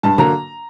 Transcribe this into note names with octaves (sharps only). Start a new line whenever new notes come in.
G2 A5
D3 F#3 A#3 A#5